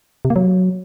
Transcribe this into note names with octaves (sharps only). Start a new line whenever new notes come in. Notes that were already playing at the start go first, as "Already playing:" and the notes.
C3
A#3
F#3